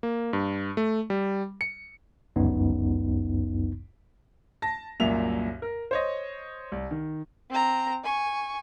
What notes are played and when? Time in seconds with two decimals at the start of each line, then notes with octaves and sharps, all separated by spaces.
0.03 A#3
0.33 G2
0.77 A3
1.10 G3
1.61 C#7
2.36 G1 C#2 F#2 B3 D#4
4.62 A5 A#6
5.00 C2 F#2 A#2 A#4 E5 F7
5.62 A#4
5.91 C5 C#5 D#5
6.72 C2
6.91 D#3
7.50 C4 A#5
8.04 G#5 C#6